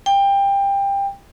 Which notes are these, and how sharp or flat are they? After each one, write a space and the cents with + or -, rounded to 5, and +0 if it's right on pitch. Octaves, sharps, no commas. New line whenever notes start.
G5 +20